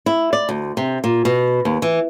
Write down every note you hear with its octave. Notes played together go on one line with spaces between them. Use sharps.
E4
D5
D2
C3
A#2
B2
D#2
E3